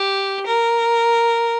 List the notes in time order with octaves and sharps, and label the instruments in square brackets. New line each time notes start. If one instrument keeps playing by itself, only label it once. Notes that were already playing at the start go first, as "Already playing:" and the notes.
Already playing: [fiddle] G4
A#4